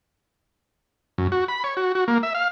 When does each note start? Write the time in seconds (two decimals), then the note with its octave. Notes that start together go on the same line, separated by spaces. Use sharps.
1.18 F#2
1.32 F#4
1.48 B5
1.64 C#5
1.77 F#4
1.95 F#4
2.08 A#3
2.23 E5
2.35 F5